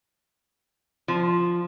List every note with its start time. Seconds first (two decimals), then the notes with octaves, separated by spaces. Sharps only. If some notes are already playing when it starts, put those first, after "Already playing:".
1.08 F3